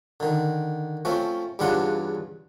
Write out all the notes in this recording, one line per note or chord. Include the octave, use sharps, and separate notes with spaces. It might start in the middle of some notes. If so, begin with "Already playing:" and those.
D3 D#3
F3 A3 C4 C#4
E2 G2 C#3 D4 F4 F#5